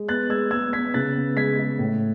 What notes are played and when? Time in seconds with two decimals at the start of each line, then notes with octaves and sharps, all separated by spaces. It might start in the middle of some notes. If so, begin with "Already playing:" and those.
Already playing: G#3
0.09 B3 F#6 A6
0.30 G#3 E6 G#6
0.51 G#3 E6 G#6
0.73 B3 G#6 B6
0.94 C#3 F#6 A6
1.16 B3
1.36 G#3 G#6 B6
1.59 G#3
1.79 A2